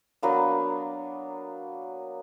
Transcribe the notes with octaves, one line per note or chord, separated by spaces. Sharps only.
F#3 A#3 B3 D4